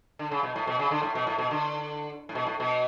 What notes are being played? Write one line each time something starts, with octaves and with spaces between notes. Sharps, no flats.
D3
C#3
B2
A2
B2
C#3
D3
A2
B2
A2
B2
D3
A2
B2
A2
B2